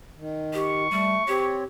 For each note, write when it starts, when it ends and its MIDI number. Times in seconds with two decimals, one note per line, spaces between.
0.18 0.87 51
0.53 0.83 67
0.53 1.58 85
0.91 1.15 55
0.91 1.23 57
1.28 1.64 60
1.28 1.65 67
1.28 1.64 73